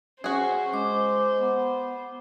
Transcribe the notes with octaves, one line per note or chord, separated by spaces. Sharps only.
C#4 F#4 G#4 C5
G#3 D6
B3